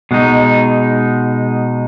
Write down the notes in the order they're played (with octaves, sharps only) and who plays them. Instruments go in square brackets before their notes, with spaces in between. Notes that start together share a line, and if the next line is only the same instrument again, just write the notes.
[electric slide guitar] B2 G#3 D#4